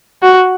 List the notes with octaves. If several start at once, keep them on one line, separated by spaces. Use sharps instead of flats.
F#4